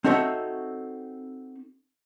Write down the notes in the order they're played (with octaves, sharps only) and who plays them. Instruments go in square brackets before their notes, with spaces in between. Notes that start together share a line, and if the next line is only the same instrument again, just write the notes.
[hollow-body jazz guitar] C4 D#4 F#4 A4 C#5 E5